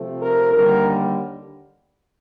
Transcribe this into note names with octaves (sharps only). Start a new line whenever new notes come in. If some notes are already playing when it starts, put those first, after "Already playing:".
Already playing: C3 F3 A3 C4
A#4
D#2 D3 G3 A#4